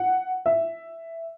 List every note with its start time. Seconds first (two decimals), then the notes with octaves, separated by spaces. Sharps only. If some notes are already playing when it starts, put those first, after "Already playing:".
Already playing: F#5
0.46 E5